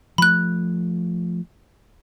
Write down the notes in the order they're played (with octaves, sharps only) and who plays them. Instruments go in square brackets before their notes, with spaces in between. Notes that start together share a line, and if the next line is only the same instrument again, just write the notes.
[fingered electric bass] F3 A3 [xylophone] B5 F#6